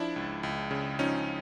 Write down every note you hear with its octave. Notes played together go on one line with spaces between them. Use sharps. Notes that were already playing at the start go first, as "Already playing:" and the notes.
Already playing: F3 D4 E4
C#2
C#2
C#3
F3 C#4 D#4